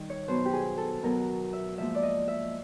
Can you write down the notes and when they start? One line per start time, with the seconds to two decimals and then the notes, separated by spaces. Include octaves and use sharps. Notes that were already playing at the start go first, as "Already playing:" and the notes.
Already playing: D#3 G3
0.10 C#5
0.28 B2 F#3 B3 C5
0.45 G4
0.53 G#4
0.78 A4
1.03 B2 F#3 B3 A#4
1.53 E5
1.78 G#2 F3 A#3 E5
1.95 D5
2.03 D#5
2.28 E5